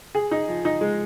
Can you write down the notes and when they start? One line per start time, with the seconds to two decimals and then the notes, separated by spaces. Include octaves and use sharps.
0.15 G#4
0.31 D#4
0.48 F3
0.65 D#4
0.81 G#3